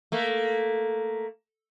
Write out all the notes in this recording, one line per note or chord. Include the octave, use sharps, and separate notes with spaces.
A3 A#3